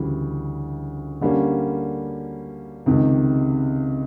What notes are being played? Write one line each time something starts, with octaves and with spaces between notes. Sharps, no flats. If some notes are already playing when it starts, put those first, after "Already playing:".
Already playing: D2 C#3 E3 G3
D3 G3 A#3 C#4
C#2 C3 D#3